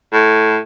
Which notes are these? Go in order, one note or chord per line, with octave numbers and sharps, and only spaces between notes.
A2